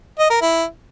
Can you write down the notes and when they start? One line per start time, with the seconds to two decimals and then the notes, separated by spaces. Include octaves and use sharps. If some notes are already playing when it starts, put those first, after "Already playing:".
0.19 D#5
0.30 A#4
0.41 E4